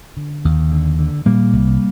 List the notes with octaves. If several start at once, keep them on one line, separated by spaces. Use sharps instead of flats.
D3
D#2
D3
D3
A#2 G3 A#3
C2